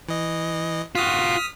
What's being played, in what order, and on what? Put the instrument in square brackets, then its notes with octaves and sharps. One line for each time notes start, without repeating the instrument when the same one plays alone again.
[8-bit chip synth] E3 D#5
[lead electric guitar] F4 F#4 [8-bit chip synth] D#6 F6 B6